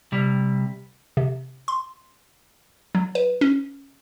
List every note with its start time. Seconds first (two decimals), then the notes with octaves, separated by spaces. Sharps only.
0.12 C3 G3
1.17 C3
1.68 C6
2.95 F#3
3.15 B4
3.41 C#4